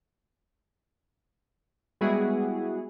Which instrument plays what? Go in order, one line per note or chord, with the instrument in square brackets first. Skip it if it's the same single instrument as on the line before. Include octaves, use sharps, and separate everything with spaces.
[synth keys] G3 G#3 B3 E4 F#4 G#4